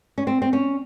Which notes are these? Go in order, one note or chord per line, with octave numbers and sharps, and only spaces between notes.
C#4
C4
C4
C#4